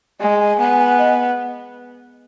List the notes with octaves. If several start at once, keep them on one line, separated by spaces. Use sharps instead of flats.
G#3 G#5
G#5
B3 G#5
G#5
D#5